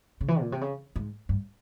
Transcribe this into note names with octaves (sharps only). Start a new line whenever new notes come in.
C#3
E3
A#2
C3
C#3
G#2
G2